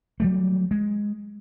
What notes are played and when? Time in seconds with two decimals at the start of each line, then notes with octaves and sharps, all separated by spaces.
0.20 F#3 G3 A3
0.71 G#3